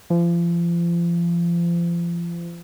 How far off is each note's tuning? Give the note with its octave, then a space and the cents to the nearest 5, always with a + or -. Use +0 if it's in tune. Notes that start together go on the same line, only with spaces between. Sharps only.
F3 -35